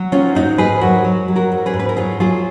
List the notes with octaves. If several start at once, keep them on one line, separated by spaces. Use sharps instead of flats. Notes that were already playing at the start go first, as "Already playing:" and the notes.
Already playing: F#3
D#3 C#4 F4
G#2 D#4 F#4
G#2 G#4 B4
F#3 F#4 A#4
F#3
F#3
F#4 A#4
G#2
G#4 B4
G#2
B4
A#4
F#3 F4 G#4
F#3 F4 G#4